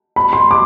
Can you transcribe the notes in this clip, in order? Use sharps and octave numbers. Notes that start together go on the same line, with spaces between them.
B5
C6
D6